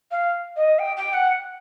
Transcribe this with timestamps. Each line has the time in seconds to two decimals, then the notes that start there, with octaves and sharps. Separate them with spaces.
0.11 F5
0.56 D#5
0.79 G5
0.97 G5
1.13 F#5